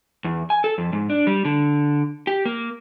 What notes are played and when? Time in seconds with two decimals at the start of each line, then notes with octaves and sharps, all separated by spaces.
0.25 E2
0.50 G#5
0.64 A4
0.78 F2
0.93 G#2
1.10 D4
1.27 G3
1.45 D3
2.27 G4
2.45 A#3